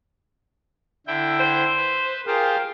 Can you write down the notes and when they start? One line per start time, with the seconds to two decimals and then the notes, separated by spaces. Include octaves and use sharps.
1.07 D3 E4 G5
1.40 C5
1.77 B4
2.27 F4 G4 G#4 A#4 C5